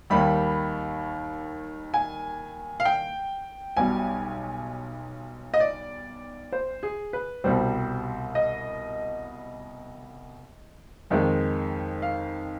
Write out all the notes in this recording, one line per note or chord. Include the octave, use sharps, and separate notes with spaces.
D#2 D#3 G3 B5
G#5
F5
G5
B1 B2 G3 G#5
D#5
D5
C5
G#4
B4
C2 B2 G3 C5
D#5
F2 D#3 G#3
F5